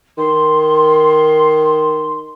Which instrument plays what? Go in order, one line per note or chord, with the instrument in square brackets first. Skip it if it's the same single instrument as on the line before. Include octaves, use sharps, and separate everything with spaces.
[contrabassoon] D#3 [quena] C6